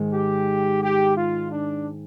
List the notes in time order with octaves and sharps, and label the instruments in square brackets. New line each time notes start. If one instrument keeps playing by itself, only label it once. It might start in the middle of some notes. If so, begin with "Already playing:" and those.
Already playing: [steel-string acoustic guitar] G#2 D#3 G#3
[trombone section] G4
G4
F4
D4